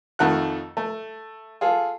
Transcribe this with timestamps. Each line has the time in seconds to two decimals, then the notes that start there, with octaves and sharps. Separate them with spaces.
0.19 F2 D#3 A3 F#5 F#6
0.77 A3
1.61 F4 G#4 A4